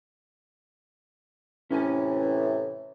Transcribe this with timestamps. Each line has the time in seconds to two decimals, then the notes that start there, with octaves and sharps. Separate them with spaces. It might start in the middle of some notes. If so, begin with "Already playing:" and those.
1.71 A2 C3 E3 C#4 G#5